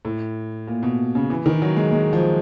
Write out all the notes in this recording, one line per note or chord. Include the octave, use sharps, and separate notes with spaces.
A2
A#2
B2
C#3
E3
D#3
F#3
G#3
G#3
F3